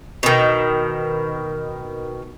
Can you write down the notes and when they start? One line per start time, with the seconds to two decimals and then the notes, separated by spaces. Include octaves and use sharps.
0.23 B2 D#3